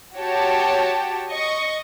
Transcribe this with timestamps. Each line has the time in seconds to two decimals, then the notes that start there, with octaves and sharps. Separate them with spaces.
0.17 F#4 G4 C#5 G5 A5
1.30 D#5 C#6